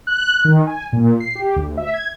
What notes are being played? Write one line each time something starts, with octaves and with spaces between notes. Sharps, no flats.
F#6
D#3
G#5
A#2
C7
G4
D2
E5
G#6